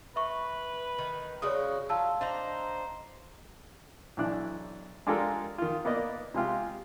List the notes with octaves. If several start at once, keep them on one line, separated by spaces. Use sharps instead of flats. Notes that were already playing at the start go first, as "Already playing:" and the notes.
B4 E5 C#6
D#3
C#3 G#3 F#4 C#5 D5 D#6
F#3 F4 F5 A5 E6
D4 D#4 C5 A#5
B1 E3 D4 F#6
G#3 D4 F4 G4 A4 A#4
D#3 F4
A#3 B3 D5 D#5
C3 G#3 F4 G4